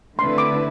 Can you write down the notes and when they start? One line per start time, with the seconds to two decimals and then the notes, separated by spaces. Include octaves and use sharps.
0.19 D3 A3 C4 E4 B4 C6
0.38 D6